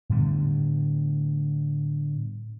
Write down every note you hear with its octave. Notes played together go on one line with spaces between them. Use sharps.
A2 D3 G3 B3